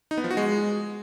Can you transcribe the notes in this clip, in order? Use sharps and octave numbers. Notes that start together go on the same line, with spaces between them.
D#4
B3
F3
F#4
G#3